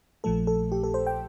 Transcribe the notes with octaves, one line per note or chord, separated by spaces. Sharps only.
A#1 A#2 F3 A3 A4
A4
G4
A4
C5
G5